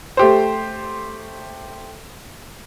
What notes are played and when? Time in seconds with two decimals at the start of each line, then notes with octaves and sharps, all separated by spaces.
0.17 A3 G4 C5